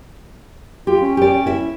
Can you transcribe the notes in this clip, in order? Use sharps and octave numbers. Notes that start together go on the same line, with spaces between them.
F4 G4
C#4
G4 D5
E4 E5